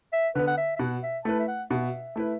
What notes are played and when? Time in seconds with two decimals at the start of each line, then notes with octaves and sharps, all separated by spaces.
0.13 E5
0.35 D3 B3 B4
0.47 F#5
0.57 E5
0.76 E5
0.79 B2 F#5
1.03 E5
1.24 A3 E4 B4 A5
1.39 E5
1.47 F#5
1.70 B2 E5
2.16 A3 E4 B4